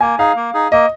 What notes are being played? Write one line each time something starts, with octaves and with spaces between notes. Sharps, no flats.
A#3 G#5
D#4 G#4 F5
A#3
D#4 G#4
A#3 D#5